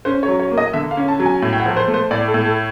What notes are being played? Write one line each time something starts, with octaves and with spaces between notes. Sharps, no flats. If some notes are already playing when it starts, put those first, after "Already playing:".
C#4 C5
C#5
F#3
C#5
A#3
D#5
D3 E5
F5
C#4
A5
F#3
G#5
A2
G5
F#5
F3
C5
A3
C5
A2 D5
A4
A2
A4